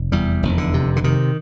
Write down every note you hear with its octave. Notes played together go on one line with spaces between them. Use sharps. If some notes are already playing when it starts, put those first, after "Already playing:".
Already playing: F1
E2 G3
F1
D3
C3
D3
C3 D#3